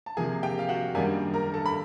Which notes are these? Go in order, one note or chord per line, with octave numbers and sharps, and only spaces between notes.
A5
C3 F3 A#3 G#4 G#5
G4 G5
F5
F#4 F#5
F#2 D#3 G3 A#3 D4 G#4 G#5
A#4 A#5
A4 A5
B5